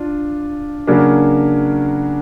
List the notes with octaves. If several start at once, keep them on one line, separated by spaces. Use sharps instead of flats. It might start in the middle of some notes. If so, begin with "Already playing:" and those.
Already playing: D4 F4
C#3 F#3 A#3 D4